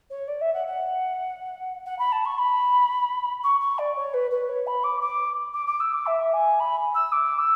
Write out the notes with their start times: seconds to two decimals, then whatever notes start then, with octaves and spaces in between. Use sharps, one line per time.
0.10 C#5
0.28 D5
0.41 E5
0.54 F#5
0.67 F#5
1.86 F#5
1.99 B5
2.12 A5
2.25 C#6
2.38 B5
3.44 C#6
3.60 C#6
3.78 D5
3.96 C#5
4.14 B4
4.31 B4
4.49 C#5
4.67 B5
4.84 D6
5.01 D6
5.53 D6
5.67 D6
5.80 E6
5.93 D6
6.06 E5
6.33 G#5
6.60 B5
6.95 E6
7.12 D6
7.38 E6